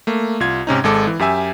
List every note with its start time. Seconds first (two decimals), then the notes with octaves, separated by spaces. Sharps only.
0.07 A3 A#3
0.40 C2 F4 G#6
0.67 G#2 C3 C#4 D#4
0.84 G#1 G#3 A4 D6
1.07 E3
1.19 F#2 G4 E5 G#5 E6